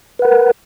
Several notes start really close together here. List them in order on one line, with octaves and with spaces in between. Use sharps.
B4 F#5 A#4